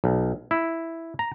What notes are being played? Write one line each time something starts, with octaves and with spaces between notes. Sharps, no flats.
B1
E4
A#5